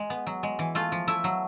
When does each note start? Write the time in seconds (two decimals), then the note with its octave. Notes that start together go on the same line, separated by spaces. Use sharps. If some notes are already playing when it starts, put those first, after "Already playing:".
Already playing: G#3
0.10 B3
0.27 F#3
0.43 G#3
0.59 E3
0.75 A3 F4 F5
0.92 F3
1.07 A3 E4 E5
1.24 F#3